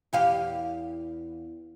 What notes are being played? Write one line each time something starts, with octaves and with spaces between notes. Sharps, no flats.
E2 G4 F5